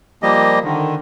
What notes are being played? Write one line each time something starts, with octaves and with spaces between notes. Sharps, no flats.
F3 G3 A#3 G4 D#5
D3 D#3